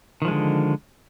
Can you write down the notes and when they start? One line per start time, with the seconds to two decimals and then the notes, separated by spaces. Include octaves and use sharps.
0.22 D#3
0.25 F3
0.28 G#3
0.31 D3